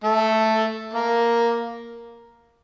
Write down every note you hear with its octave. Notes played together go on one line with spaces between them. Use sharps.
A3 A4
A#3 A#4